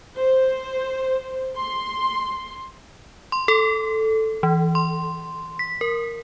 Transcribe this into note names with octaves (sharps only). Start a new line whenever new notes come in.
C5
C6
C6
A4
E3
C6
B6
A#4